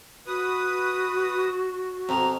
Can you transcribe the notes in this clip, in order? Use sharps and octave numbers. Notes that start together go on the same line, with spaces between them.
F#4 B4 D#6
F2 B2 A#5